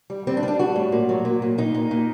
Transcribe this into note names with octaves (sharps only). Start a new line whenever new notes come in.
G3
G3 C4
D4
G3
D4
G3 F#4
A2
A#2
F#3
A#2
A#2
A#2 D#4
A#2
A#2